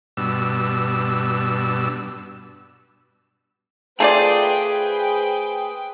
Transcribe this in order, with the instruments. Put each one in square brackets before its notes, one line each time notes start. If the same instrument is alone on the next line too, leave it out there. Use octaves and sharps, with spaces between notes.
[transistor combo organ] G2 B2 E6
[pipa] A3 F4 D5 [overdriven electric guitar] G#4 [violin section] B4 C5 G5